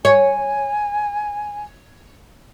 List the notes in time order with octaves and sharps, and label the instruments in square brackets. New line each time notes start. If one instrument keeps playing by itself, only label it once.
[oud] C#5 [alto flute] G#5